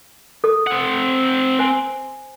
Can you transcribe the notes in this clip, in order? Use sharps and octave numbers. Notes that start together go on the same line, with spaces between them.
A4 D#6
C4 F#5
C5 G#5